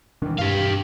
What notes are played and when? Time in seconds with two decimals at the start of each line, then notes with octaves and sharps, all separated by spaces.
0.22 E1 C2 D#3 E3 D4
0.38 G2 G4 F5